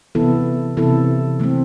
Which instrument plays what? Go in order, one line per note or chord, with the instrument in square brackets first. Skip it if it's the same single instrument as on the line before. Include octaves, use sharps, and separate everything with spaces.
[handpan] C3 E3 B3 E4 A4
C3 E3 B3 E4 A4
E3 A3 C4